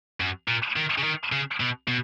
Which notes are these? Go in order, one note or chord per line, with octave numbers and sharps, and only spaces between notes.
F#2
A#2
D#3
C#3
D#3
C#3
B2
B2